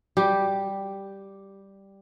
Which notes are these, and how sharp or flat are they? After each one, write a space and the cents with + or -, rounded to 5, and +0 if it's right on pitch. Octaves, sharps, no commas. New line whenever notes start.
G3 +0 G4 +0